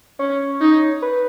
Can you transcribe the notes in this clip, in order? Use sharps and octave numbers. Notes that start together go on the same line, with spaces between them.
C#4 C#5
D#4
B4